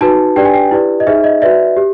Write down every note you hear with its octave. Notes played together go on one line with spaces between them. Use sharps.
D#4 F#4 B4 A5
D4 G4 B4 D5 G5
G#5
G5
E4 G4 B4 D5
D#5
D#4 G#4 C5 E5
D#5
F#4 B4 D5 E5
G4